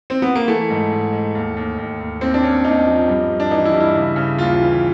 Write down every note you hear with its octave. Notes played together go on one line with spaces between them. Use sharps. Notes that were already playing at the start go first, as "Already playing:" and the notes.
C4
B3
A#3
E3 A3
G#2
G#2
G#2
D#2
D#2
D#2
D#2
D#2 C4
D4
D#2 C#4
D#2 D#4
F3
G2
G2
D4
E3 D#4
E4
G2
E4
C#3
C#3
D#2 F4
E3